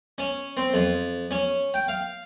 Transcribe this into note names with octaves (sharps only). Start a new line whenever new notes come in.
C#4
C4
F2
C#4
G5
F5